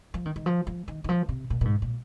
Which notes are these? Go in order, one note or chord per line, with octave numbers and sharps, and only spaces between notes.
F3
D#3
D#3
F3
F3
D#3
D#3
F3
C3
A#2
A#2
G#2
A#2